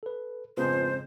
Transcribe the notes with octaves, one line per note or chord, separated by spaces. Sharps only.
A4 B4
F2 G#2 C#3 B3 F4 B4 C5